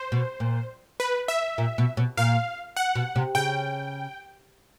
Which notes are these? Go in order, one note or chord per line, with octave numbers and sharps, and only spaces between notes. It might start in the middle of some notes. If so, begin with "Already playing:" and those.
Already playing: C5
B2
A#2
B4
E5
A#2
B2
B2
A#2 F5
F#5
B2
C3
C#3 G5